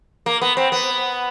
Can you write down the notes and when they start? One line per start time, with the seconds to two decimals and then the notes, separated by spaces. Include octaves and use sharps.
0.26 A#3
0.42 B3
0.57 C4
0.72 B3